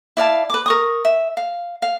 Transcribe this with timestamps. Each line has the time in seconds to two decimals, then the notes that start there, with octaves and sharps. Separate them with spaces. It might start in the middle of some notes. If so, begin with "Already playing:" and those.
0.17 E4 D5 F5 A5
0.50 B4 D6
0.66 A#4 C#6 D#6
1.05 E5
1.37 F5
1.82 F5